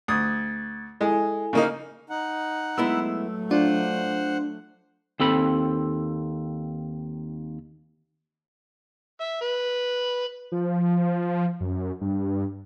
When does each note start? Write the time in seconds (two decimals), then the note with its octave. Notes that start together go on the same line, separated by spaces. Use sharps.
0.08 D2 D#6 G#6 A6
1.01 G#3 E4 A4 G#5
1.53 C#3 A#3 D#4
2.10 D#4 F#5
2.78 F#3 G#3 A3 B3 E4 E6
3.51 D4 F4 C5 F#5
5.20 D#2 C4 A4 B5
9.20 E5
9.41 B4
10.52 F3
11.61 F#2
12.01 G2